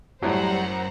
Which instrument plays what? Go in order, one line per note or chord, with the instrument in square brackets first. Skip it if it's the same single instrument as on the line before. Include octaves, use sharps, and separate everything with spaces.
[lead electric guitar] F#2 [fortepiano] A2 F#3 [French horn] G3 [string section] C5 F#5 A#5